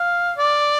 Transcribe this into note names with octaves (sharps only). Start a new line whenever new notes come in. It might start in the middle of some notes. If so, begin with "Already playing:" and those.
Already playing: F5
D5